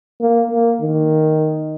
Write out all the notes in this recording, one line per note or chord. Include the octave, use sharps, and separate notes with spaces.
A#3
A#3
D#3